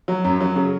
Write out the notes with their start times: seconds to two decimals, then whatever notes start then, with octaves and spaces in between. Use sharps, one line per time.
0.08 F#3
0.24 F#2
0.41 F#3
0.56 C#3